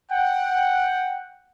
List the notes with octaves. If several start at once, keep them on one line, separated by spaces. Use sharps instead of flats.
F#5 G5